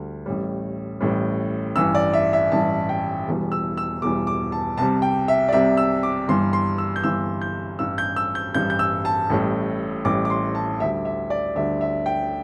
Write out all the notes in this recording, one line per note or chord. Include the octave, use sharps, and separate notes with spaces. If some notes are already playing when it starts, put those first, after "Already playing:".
Already playing: D2 D3 G3
A1 A2 G3
A1 A2 G3
A1 G2 E3 E6
D5
E5
E5
A1 G2 E3 A5
G5
E1 E2 E3 G3
E6
E6
E1 E2 E3 G3 D6
D6
A5
C2 C3 G3 A5
G5
E5
D5
C2 C3 G3 E5
E6
D6
G1 G2 E3 G3 C6
C6
E6
G6
G1 G2 E3 G3 E6
G6
A1 G2 G3 E6
G6
E6
G6
A1 G2 G3 G6
G6
E6
A5
A1 A2 G3
A1 A2 G3 D6
D6
C6
A5
D2 D3 G3 E5
E5
D5
D2 D3 G3 E5
E5
G5